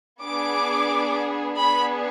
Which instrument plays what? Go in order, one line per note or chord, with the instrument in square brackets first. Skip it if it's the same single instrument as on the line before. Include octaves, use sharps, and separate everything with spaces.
[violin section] B3 D4 G#4 D6
B3 D4 G#4 B5